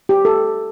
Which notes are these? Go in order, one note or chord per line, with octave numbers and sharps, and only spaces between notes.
G4
A4